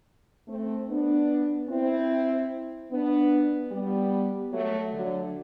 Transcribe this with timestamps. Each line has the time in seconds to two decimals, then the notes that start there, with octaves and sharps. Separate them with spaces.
0.48 A3 C4
0.88 B3 D4
1.69 C4 E4
2.91 B3 D4
3.72 G3 B3
4.52 F#3 A3
4.93 D3 F#3